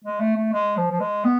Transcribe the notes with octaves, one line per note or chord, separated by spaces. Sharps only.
G#3
A3
A3
G#3
F3
F3
G#3
B3